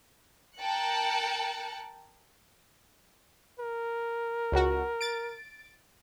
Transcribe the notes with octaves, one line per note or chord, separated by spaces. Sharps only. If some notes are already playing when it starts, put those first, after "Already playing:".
A#4 G5 A5 F#6 C#7
A#4
C#2 F#4
A6 D7